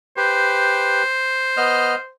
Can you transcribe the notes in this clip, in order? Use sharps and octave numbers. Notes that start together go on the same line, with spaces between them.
G4 B4 C5
B3 D#5 F6